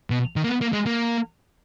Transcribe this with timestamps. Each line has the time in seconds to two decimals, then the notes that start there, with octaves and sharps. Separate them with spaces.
0.10 B2
0.36 D#3
0.44 A#3
0.48 B3
0.61 A#3
0.73 G#3
0.86 A#3